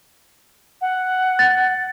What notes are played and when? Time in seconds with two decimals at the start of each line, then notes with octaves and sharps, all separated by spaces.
0.81 F#5
1.39 A6